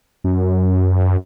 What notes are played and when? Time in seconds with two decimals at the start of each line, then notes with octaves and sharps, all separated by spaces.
0.24 F#2